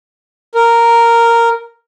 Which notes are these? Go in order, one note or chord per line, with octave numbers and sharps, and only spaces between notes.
A#4